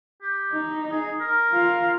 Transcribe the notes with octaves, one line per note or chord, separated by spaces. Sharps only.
G4
D#4
G#4
A#4
F4 F5